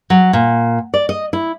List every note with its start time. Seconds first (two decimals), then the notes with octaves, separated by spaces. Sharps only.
0.10 F#3
0.33 A#2
0.94 D5
1.09 D#5
1.33 E4